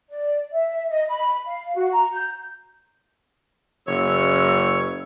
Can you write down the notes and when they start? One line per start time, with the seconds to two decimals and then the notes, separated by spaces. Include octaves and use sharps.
0.10 D5
0.52 E5
0.89 D#5
1.08 B5
1.45 F5
1.75 F#4
1.92 A#5
2.13 G6
3.87 F#1 C#5 E6